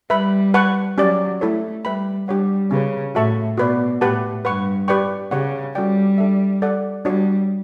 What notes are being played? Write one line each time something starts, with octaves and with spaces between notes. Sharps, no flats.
G3 B4 E5 B5
B4 F#5 A5 C#6
F#3 C#4 G4 D5
A3 E4 A4 C#5
G3 B4 E5 G5 B5
G3 D4 G4 C#5 F#5
C#3 C#4 G4 B4
A2 F#4 A4 E5 A5 C#6
B2 F#4 B4 D5
A2 G4 B4 F#5 A5
G2 B4 F#5 C#6
G4 B4 D5 G5 C#6
C#3 G4 C#5 F#5 C#6
G3 C#4 F#4 A4 D5 G5
D4 A4 E5
A4 D5 F#5
G3 D4 F#4 C#5